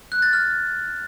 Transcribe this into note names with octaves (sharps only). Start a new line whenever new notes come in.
F#6
A6
F6